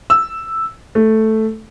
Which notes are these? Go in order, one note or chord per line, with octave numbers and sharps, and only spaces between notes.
E6
A3